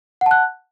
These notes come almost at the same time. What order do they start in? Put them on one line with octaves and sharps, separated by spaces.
F#5 A5 F#6